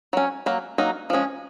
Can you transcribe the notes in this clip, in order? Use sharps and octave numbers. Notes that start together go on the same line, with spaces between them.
F#3 C#4
F#3 A#3
F#3 A#3 D#4
F3 G#3 C#4